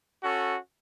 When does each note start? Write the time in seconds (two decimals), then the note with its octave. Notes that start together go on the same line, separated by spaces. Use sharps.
0.21 C#4 F#4 A4